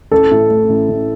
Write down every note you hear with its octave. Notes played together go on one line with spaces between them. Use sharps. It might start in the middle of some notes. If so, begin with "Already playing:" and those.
A1 A4
A2
A3
A1
A1